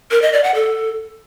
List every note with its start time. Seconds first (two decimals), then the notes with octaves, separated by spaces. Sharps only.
0.11 A#4
0.22 D#5
0.33 D5
0.44 F#5
0.55 A4